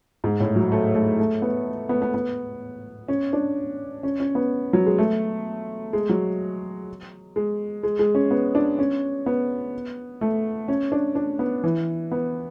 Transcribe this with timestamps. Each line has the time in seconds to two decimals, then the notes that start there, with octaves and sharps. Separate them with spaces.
0.24 G#2
0.40 A2
0.56 F#3
0.72 A3
0.95 A3
1.19 A3
1.42 B3
1.89 B3
2.02 B3
2.14 B3
3.08 C#4
3.33 D4
4.03 C#4
4.20 C#4
4.35 B3
4.73 F#3
4.86 G#3
4.98 A3
5.93 G#3
6.09 F#3
7.36 G#3
7.83 G#3
7.99 G#3
8.15 C#4
8.31 B3
8.55 D4
8.79 C#4
9.26 B3
10.21 A3
10.68 C#4
10.92 D4
11.15 D4
11.39 B3
11.64 E3
12.12 B3